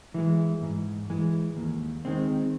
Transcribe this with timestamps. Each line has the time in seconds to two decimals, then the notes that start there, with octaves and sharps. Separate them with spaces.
0.14 E3 G#3
0.62 G#2
1.10 E3 G#3
1.57 D#2
2.05 D#3 G#3 C4